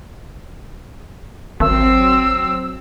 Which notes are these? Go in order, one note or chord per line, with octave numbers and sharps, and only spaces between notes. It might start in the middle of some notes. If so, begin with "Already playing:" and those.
G#1 F#3 C4 E6